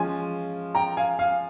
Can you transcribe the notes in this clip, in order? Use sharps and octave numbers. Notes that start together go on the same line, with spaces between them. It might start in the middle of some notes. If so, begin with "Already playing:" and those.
Already playing: F3 G#3 C#4 F4 G#5 C6
G5 A#5
F5 G#5
F5 G#5